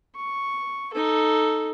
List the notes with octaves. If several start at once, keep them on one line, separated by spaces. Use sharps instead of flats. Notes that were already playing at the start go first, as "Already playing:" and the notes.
C#6
D#4 A4